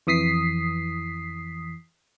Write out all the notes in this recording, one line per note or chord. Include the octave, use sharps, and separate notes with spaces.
F2 E3 D#6 B6 C7